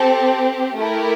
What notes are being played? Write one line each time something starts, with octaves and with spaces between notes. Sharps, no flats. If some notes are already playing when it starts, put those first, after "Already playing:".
Already playing: C4 G4 A4
A3 E4 G4 A#4